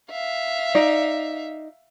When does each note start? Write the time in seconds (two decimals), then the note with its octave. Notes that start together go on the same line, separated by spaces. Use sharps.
0.11 E5 F5
0.75 D#4 D5